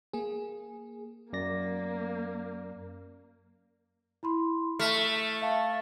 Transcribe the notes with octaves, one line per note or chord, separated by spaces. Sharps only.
A#3 G#4
F#2 A#3 D5 A#6
E4 B5 C6
A3 F6 B6
E5 F5 A5